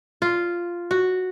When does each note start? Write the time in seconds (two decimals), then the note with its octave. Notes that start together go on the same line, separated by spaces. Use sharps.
0.22 F4
0.91 F#4